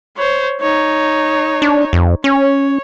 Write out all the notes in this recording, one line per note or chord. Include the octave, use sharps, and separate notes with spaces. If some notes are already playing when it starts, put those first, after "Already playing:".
C5 C#5
D#4 C#5
D4
F2
C#4 C#5